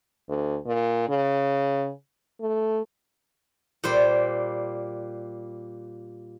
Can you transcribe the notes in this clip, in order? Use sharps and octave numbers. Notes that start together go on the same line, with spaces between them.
D2
A#2
C#3
A3
A#2 G3 C5 G5